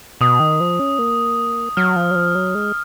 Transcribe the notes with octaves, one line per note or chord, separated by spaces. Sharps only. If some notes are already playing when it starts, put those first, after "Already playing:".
B2 D#6
D#3
F3
C#4
A#3
F#3 F6
F3
F#3
F3
F#3
G#3